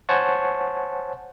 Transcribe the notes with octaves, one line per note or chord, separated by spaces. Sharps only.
C5 C#5 F#5 G#5 A5 C#6